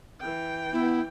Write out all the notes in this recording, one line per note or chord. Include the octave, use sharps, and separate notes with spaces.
E3 G5
B3 E4